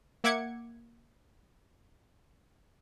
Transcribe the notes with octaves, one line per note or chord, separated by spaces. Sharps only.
A#3 E5 F#5 D6 G#6 C#7